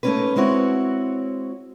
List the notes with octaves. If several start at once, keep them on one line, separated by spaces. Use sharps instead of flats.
A3 A#3 C4 C#4 D#4 B4
G#3 C4 E4 F#4 C#5